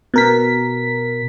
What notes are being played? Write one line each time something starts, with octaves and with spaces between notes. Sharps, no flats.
B2 A#4 B6